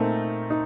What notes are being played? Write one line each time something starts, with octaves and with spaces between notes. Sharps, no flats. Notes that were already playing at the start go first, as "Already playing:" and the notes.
Already playing: A#2 A3 C4 D#4 A#4 A#5
D#4